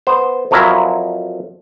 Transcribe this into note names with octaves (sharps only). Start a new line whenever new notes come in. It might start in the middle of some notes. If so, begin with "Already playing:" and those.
B3 C5
F2 F3 F#3 E4 A#4